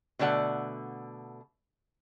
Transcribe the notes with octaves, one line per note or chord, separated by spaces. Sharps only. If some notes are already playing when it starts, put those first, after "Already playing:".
B2 D3 A3 D5 F#5